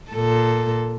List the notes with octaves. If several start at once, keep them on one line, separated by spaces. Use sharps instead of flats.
A#2 A4